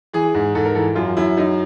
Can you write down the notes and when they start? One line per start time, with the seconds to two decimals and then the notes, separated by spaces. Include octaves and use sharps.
0.13 E3 G#4
0.34 G#2
0.55 G#2 A4
0.65 A#4
0.75 E3 A4
0.95 F#2 F4
1.17 F#2 E4
1.37 F#2 D#4